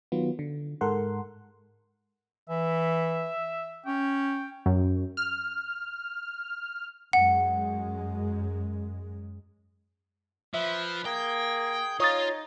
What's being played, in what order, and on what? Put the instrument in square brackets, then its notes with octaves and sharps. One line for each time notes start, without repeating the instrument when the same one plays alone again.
[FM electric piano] D#3 F#3 B3 F4
D3
G#2 G#3 A4 A#4 F#5 C6
[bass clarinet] E3 [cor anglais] E5
[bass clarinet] C#4 [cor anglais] G5
[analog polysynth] F#2
F6
[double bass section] F#2 G#3 [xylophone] F#5
[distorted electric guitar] F3 [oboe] B4 [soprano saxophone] E5
[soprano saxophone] A#3 [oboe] G#4 [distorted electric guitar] G5
[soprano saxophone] D#4 [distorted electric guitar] F4 F5 [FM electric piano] C#5 D#6 A6